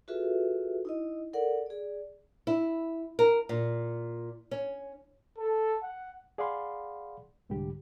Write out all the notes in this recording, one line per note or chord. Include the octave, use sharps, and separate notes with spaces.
F4 F#4 G#4 A4 B4 E5
D#4 E4 D#5
A4 A#4 D5 F#5
G#4 D5
E4
A#4
A#2
C#4
A4
F#5
G#4 D5 F5 F#5 B5 C6
C2 G#2 D3 G3 G4